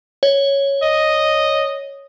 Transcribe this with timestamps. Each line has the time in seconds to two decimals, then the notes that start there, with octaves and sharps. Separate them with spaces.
0.23 C#5
0.83 D#5